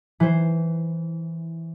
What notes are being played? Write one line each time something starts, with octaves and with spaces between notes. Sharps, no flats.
E3 C5